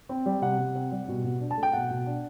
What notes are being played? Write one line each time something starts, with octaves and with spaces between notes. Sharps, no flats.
C4
G3
C3 F#5
C3
C4
G3
B2
B2
D4
A5
A3
G5
B2 F#5
B2
D4